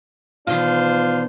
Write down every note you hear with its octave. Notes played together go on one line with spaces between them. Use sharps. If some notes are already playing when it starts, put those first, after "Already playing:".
B2 D#3 E3 D4 F4 C5